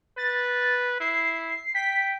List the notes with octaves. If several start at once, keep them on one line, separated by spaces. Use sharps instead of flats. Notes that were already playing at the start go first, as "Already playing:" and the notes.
B4 A6
E4 C7
G5 B6